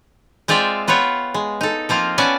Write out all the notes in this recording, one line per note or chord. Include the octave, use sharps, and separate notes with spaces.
G#3 C4 F4 D5 E5 G5
B3 F4 B4 C#5 G5
G#3
D#4 A4
F3 A#3 C4 F4
B3 C#4 D5 G#5 A5